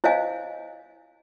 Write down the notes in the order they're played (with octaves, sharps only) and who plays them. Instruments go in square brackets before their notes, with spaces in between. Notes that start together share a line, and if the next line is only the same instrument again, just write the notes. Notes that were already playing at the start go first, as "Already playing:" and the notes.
[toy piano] E4 C5 C#5 D#5 F5 G#5